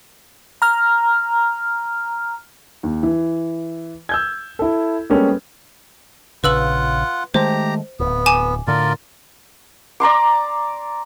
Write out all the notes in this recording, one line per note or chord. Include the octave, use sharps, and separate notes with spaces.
A#5 F6
D#2
E3
E6 G6 G#6
E4 A4
G3 G#3 A#3 B3 C#4 A4
A#1 C#3 F4 B4 F#5 E6 F#7
D#3 G#3 A3 G4 C5 A#5
D1 B3
G#5 D6 E7
A2 D3 F4 A#4 D5
D5 A#5 C6 D6